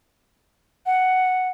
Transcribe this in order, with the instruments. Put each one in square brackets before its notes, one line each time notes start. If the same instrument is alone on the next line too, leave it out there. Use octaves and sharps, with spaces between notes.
[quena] F#5